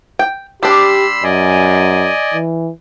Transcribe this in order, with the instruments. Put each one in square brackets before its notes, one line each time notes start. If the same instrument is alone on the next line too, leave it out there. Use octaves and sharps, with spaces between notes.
[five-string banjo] G5
[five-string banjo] G3 D4 [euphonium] G4 [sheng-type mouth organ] B5 C6 E6
[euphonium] F#2 [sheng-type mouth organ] D5 D#5 G#5
[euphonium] E3